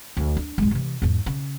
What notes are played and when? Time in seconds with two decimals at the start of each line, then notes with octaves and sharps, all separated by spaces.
0.17 D2
0.37 D4
0.58 A1 G#3
0.71 C3 E3
1.02 E2 G#2
1.26 C#3